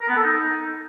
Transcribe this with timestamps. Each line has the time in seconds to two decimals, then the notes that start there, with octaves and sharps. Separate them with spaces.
0.01 A#4
0.08 B3
0.16 A4
0.23 D#4